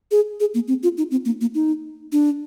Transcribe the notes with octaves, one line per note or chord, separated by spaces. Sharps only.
G#4
G#4
A#3
C4
F4
D#4
C4
A#3
A#3
D#4
D4